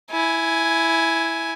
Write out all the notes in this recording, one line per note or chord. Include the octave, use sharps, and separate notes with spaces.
E4 G#5